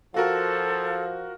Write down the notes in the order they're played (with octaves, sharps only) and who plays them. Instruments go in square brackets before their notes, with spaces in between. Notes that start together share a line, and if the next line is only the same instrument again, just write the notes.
[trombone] F3 [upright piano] F4 F#4 A#4 [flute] A4